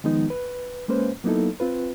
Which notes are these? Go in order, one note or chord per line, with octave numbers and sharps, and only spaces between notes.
D#3 F3 G#3 B3 D#4
B4
G#3 A#3 C#4 B4 C5
F#3 A#3 B3 D#4 E4 A4
C4 F4 B4